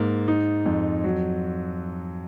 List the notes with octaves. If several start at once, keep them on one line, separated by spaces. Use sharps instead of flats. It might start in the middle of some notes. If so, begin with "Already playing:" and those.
Already playing: G#2 A#3
D#4
F2
F#3